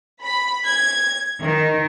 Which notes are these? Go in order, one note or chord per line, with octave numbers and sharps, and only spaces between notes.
B5
G#6
D#3